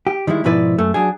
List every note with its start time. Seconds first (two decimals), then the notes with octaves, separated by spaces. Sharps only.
0.07 G4
0.27 D#3 G3 G#3 E4
0.44 G#2 B2 F3 E4 B4 D5
0.78 F#2 A3
0.94 F#3 D4 G#4